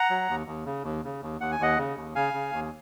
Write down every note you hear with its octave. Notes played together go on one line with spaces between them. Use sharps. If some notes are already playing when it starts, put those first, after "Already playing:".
Already playing: F#5 A#5
F#3
D#2
D#2
C#3
D#2
C#3
D#2
D#2 F#5
G#5
D#2 D#5 F#5
C#3
D#2
C#3 F5 G#5
C#3
D#2